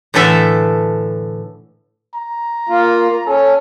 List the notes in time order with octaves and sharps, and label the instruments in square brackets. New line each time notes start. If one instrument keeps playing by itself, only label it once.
[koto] A2 D3 E3 A4 E5
[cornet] A#5
[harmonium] A#3 F4
[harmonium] C#4 [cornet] A4